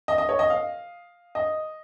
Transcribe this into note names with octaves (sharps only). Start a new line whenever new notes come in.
D#5
D#5
C#5
D#5
F5
D#5